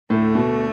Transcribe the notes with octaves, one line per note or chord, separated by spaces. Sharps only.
D2 A2 D3 A3
B2